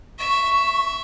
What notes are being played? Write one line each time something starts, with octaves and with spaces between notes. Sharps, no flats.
E5 C#6